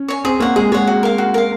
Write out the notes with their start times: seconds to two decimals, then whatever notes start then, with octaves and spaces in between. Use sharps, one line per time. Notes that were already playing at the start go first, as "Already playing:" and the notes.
Already playing: C#4
0.08 C#5 G#5
0.24 C4 G#4
0.40 A#3 C#5 F#5
0.56 G#3 G#4
0.72 G#3 C#5 F#5
0.87 F#4
1.03 A#4 F5
1.18 F#4
1.34 A#4 F5